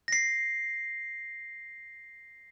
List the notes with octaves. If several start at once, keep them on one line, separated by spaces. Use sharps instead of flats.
A#6 C7